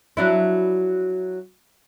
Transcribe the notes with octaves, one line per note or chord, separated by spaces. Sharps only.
F#3 D4 E4